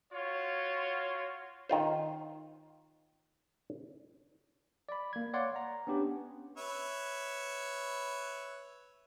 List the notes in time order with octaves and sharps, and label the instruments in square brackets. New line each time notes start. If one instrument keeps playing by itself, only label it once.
[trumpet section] F4 F#4 C#5
[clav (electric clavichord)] D#3 F4 C5
[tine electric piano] D5 B5
A#3 G#6
C#5 D5 F5 F#5 C6
A#5
B3 C#4 D4 G4
[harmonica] B4 C#5 E5